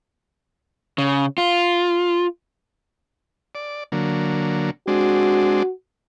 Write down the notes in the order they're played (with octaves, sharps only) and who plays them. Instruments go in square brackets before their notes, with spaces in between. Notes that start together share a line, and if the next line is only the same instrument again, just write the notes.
[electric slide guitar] C#3
F4
[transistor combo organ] D5
D3 F#3 A#3
[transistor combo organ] G#3 C4 D4 [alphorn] F#4